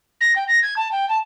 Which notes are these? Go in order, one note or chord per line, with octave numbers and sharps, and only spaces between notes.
A#6
G5
A#6
G#6
A5
G5
A5